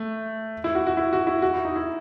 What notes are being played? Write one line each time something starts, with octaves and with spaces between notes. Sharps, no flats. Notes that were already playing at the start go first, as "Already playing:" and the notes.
Already playing: A3
E4
F#4
F#4
E4
F#4
E4
F#4
E4
D#4
E4